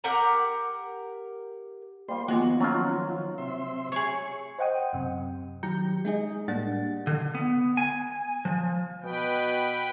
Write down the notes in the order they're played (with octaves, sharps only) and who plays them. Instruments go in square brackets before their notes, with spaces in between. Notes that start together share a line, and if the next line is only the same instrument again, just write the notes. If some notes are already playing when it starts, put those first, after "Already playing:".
[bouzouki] G4 A#4 F#5 A#5
[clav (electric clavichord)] G3 F4 [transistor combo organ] A#3 C5 C6
[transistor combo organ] D#3 F3 [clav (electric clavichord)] G#3 [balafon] A#3 B3 F4 [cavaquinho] F#4
[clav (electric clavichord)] F#3 F4 [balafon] C#4
[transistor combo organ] C3 E5 C6
[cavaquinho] G#4 C#5 [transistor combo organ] C#6
[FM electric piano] C5 D#5 F#5 G5 D#6
F#2 C3
D#3 F#3 G4 A#5 G6 C#7
G#3 D#4 G#4 D#5
A2 G3 A#3 D4 F#5 A6
[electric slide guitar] D3
B3
G#5
F3
[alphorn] B2 [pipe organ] B4 G5